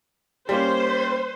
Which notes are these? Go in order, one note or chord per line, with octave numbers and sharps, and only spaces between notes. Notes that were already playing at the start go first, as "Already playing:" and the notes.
G3 A#3 C#4 C5